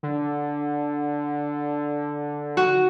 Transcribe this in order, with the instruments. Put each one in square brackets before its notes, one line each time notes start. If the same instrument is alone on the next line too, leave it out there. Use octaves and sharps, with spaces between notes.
[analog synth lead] D3
[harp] F#4